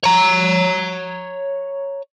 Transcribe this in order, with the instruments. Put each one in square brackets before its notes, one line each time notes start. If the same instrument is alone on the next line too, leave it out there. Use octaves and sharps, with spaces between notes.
[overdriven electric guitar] C#5 A#5